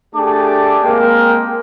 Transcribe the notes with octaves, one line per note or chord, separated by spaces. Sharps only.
A3 D4 G4 G#4 A5 D6
G#3 A#3 C4 A#4 G5